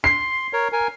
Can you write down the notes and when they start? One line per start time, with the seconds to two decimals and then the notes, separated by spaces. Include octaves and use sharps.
0.04 C6 C7
0.53 A#4 C#5
0.72 A#4 G#5